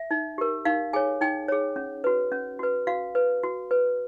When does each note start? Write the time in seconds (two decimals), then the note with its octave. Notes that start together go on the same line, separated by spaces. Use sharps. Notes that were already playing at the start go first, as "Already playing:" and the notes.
Already playing: E5
0.11 D#4
0.38 G4 A#4
0.65 D#4 F5
0.93 G#4 C#5 G#5
1.21 D#4 G5
1.49 G#4 C#5
1.76 C#4
2.04 F#4 B4
2.32 C#4
2.59 F#4 B4
2.87 F#4 F5
3.15 B4
3.43 F#4
3.71 B4